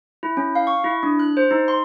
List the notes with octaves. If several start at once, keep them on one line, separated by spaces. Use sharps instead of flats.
E4
C#4
F5
C#6
E4
D4
F#6
C5
D#4
C6